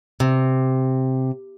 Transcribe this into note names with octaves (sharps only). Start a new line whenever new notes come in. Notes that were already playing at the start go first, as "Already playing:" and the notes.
C3